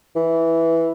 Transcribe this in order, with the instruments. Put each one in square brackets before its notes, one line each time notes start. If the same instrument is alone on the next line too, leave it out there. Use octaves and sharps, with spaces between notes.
[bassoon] E3